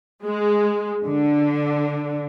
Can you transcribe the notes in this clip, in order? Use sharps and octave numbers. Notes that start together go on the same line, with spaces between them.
G#3
D3